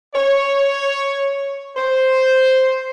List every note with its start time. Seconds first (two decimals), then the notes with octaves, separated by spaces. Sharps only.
0.14 C#5
1.77 C5